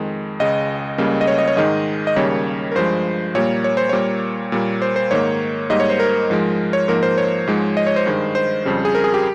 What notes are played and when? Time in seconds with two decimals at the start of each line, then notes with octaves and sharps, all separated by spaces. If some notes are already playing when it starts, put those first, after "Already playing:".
Already playing: F2 D#3 G#3
0.40 C#2 C#3 G#3 D#5
0.98 C#2 C#3 G3 A#3
1.21 D#5
1.27 C#5
1.38 D#5
1.48 C#5
1.57 G#2 D#3 G#3 D#5
2.07 D#5
2.16 D#2 C#3 G3 A#3 C#5
2.72 A#4
2.75 G2 F3 G#3 C5
3.35 A#2 G3 A#3 C#5
3.64 C#5
3.77 C5
3.89 A#2 G3 A#3 C#5
4.52 A#2 G3 A#3
4.82 C5
4.96 C5
5.11 G#2 D#3 A#3 C#5
5.70 G#2 G3 A#3 D#5
5.80 C#5
5.90 C5
6.00 A#4
6.30 G#2 F3 G#3
6.73 C#5
6.88 G#2 F3 A#3 A#4
7.03 C5
7.18 C#5
7.47 G#2 F3 G#3
7.77 D#5
7.87 C#5
7.96 C5
8.06 G2 D#3 G#3
8.35 C5
8.65 F2 C#3 G3
8.85 G#4
8.95 A#4
9.04 G#4
9.14 G4